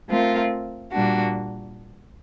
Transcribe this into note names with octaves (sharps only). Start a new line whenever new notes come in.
A3 C4 F4 A#4
A#2 G3 A#3 D4 F#4